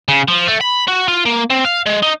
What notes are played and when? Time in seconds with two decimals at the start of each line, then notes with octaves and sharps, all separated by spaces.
0.08 C#3
0.28 F3
0.48 A3
0.61 B5
0.88 F#4
1.08 F4
1.26 A#3
1.50 C4
1.65 F5
1.86 G#3
2.03 D#4